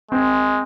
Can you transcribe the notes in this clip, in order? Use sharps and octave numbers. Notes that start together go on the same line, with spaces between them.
G#3 C4